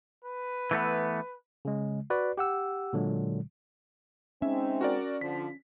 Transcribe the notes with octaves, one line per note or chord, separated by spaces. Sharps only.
B4
E3 A3 B3
C#3 G#3
F#4 B4 D5
G4 F#5 E6
A#2 D3 F#3 G#3
G#3 C4 C#4 D#4 E5
F#4 A#4 D5
D3 F3 B6